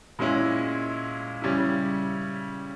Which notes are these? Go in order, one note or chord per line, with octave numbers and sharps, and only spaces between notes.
A#2 G#3 C#4 E4
C#3 G3 C#4 E4